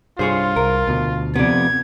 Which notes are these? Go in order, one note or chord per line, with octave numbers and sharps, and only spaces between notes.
C2 G2 F4 G#4 C5 C#5
C2 A#4
D2 B2
F2 C3 B3 D5 G#6